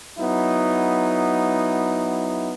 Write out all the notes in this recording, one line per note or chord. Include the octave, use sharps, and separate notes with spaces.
F#3 B3 D#4 E4